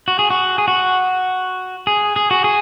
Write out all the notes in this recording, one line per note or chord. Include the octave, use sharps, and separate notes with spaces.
F#4
G#4
F#4
G#4
F#4
G#4
G#4
F#4
G#4